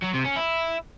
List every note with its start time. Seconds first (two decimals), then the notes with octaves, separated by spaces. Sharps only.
0.02 F#3
0.13 C3
0.25 C#4
0.36 E4